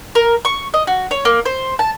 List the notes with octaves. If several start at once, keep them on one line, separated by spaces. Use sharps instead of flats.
A#4
C#6
D#5
F#4
C#5
A#3
C5
A5